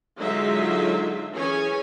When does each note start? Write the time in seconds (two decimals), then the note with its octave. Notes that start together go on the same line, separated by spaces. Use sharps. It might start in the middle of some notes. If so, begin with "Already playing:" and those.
0.18 D3 F#3 G#3 D#4 F4 E5
1.33 E3 C#4 G#4 C#5 G#5